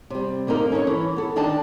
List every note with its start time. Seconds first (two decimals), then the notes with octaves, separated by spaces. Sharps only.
0.10 C3 G3
0.47 D3 A#3 C4 D#4 A#4
0.72 C#4 A4 A#4 C#5
0.87 E3
1.16 B3 A4
1.36 D3 D#3 D4 D#4 D5 A5